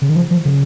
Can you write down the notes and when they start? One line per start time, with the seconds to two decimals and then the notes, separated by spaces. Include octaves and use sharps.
0.02 C#3
0.09 D#3
0.16 F3
0.31 F3
0.45 C#3